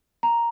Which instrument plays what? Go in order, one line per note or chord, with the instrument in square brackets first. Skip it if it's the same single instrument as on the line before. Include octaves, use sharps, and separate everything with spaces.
[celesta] A#5